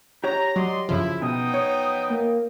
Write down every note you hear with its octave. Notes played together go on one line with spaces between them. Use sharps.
G4 C#5 A#5
F#3 D5 D#5 C6
F#2 C#3 F3 E4
B2 B3 D#4 G5 D#6
C#5
A#3